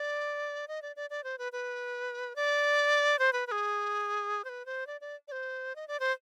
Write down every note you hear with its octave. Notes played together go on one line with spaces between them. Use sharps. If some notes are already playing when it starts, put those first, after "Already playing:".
Already playing: D5
D#5
D5
D5
D5
C5
B4
B4
D5
C5
B4
B4
G#4
C5
B4
C5
D5
D5
D5
C5
D#5
D5
C5